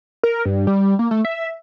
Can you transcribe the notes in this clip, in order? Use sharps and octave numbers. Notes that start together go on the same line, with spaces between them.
A#4
G2
G3
A#3
A3
E5